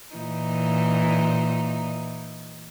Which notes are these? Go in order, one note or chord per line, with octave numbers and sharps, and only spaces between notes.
A#2 E3 D#4